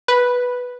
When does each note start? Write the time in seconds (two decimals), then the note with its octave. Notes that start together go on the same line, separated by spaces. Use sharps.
0.08 B4